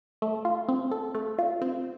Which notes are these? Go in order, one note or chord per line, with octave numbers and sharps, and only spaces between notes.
A3
F4
C4
A4
A3
F4
C4